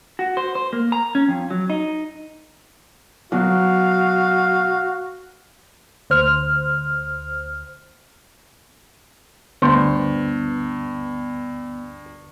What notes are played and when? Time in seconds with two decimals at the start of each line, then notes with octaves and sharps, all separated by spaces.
0.19 F#4
0.37 C5
0.55 C5
0.73 A#3
0.92 A#5
1.15 C#4
1.28 F2
1.51 F#3
1.70 D#4
3.32 B2 F#3 F#4 F5
6.10 D2 C5 F6
9.62 D2 G2 B3 C5